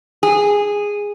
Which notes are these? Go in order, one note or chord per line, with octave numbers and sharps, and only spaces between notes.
G#4